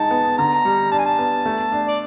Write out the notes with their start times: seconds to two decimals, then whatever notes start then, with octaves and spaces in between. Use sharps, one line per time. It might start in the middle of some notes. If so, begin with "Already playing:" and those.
Already playing: G#3 D#4 A5
0.11 B3
0.38 D3 A#5
0.65 G3
0.92 D4 A5
0.99 G#5
1.06 A5
1.18 B3
1.45 A3
1.72 D4
1.87 D5